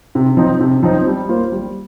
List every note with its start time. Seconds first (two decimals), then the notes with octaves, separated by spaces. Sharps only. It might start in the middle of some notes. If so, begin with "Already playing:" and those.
0.15 C3
0.37 F3 C4 D#4
0.60 C3
0.83 F3 C4 D#4
1.07 G3
1.29 A#3 F4 C5
1.52 G3